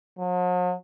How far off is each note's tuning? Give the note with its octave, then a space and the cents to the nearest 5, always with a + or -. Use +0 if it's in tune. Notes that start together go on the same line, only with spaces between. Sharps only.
F#3 -45